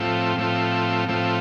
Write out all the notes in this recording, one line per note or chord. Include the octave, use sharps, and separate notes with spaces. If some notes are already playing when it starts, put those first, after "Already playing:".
Already playing: A2 F3 A3 C4 F4
A2 F3 A3 C4 F4
A2 F3 A3 C4 F4